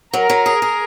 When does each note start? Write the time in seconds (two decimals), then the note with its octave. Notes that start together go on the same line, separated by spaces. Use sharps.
0.13 F#3 A#4
0.30 F#3
0.46 G#4
0.62 G#4